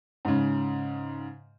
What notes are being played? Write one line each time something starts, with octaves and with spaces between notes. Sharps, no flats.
G#2 C#3